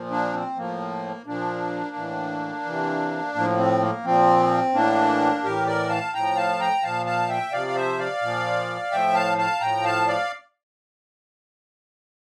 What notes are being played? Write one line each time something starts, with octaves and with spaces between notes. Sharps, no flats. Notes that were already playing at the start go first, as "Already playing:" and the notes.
Already playing: A#2 F3
A#3 D4
C4
A2 F3 A#3
A#2 F3 A#3 D4
A2 E3
C3 E3
A2 F3 A#3
C4
A#3
A#2 F3 C4
A2 E3 A#3 D4
A2 E3 G4 A#4
A#4 D5
F5 A5
A2 F3 G5 A#5
F5 A5
G5 A#5
A#2 F3 F5 A5
F5 A5
E5 G5
C3 F3 D5 F5
F5
C5 E5
D5 F5
A#2 F3
A2 F3 E5 G5
F5 A5
F5 A5
A2 F3 G5 A#5
F5 A5
D5 F5